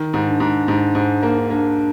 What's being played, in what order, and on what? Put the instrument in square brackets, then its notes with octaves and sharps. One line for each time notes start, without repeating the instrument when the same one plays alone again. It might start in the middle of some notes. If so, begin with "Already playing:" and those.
Already playing: [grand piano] D#3
G#2
[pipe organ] D4
[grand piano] G#2
G#2
G#2
A#3
[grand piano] A#3 [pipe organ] D4